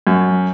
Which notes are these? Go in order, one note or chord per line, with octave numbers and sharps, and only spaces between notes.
F#2